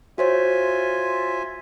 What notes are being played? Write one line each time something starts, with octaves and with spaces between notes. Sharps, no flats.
F4 F#4 C5 C#5 E5 G#5